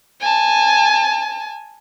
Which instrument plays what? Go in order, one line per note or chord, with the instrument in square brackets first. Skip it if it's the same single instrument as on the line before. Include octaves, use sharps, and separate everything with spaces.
[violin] G#5 A5